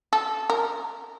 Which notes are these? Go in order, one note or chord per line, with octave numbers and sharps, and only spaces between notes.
A4
A#4